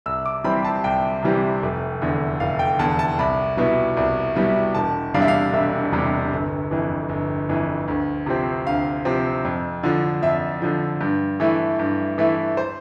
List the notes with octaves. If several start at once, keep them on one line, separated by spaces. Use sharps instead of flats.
C2 E6
D6
C3 E3 G3 C4 B5
A5
C2 G5
C3 E3 G3 C4
F1
E2 D3
F1 F5
G5
E2 D3 A5
A5
C2 B5
B2 G3 B3 E4
C2
B2 G3 B3 E4
E1 A5
E2 C3 G3 D4 F5
E5
F5
E1 E5
E2 C3 G3 D4
G1
F2 E3
G1
F2 E3
D2
C3 F3 C4
D2 F5
C3 F3 C4
F2
D3 F3
F2 E5
D3 F3
G2
E3 A3 E4
G2
E3 A3 E4
C5